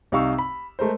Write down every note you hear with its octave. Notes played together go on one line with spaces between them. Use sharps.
C2 D#4 G4 F5 C#6 E6
B5
G#3 A3 A#4 C5